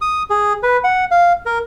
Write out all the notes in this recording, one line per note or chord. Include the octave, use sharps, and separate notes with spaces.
D#6
G#4
B4
F#5
F5
A#4